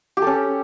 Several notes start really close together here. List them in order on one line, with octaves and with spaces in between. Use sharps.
G4 A4 C#4